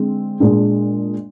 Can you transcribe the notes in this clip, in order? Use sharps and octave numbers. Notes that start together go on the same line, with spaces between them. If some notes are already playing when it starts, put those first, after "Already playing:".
Already playing: D3 G#3 C4
A#2 G#3 D4